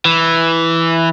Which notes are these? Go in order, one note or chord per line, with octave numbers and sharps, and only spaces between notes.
E3